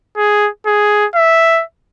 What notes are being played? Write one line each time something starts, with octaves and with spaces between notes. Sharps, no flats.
G#4
G#4
E5